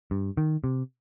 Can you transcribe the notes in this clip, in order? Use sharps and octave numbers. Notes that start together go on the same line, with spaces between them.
G2
D#3
C3